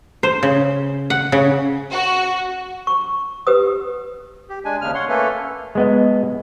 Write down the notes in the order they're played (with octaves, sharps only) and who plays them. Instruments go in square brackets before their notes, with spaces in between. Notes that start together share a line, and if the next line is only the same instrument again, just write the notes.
[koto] C5
C#3
F#5
C#3
[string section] F#4
[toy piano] C#6
G4 B4 D#6
[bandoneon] G4
G#3 D4 G#5
D#2 C#3 F6
C#5 F#5 C6
A3 A#3 C#4 A4 B4
[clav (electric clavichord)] G#3 B3 D#5